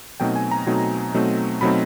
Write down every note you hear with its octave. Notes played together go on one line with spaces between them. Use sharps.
B2 F#3 A3 C4 D#4 G5
G#5
A#5
B2 F#3 A3 C4 D#4
B2 F#3 A3 C4 D#4
B2 F#3 A3 C4 D#4 B5